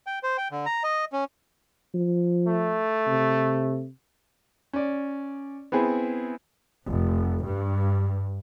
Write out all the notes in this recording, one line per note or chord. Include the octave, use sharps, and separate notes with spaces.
G5
C5
G5
D3
A#5
D#5
C#4
F3
A3
C3
C#4 D5
B3 C4 E4 G#4
F1
G2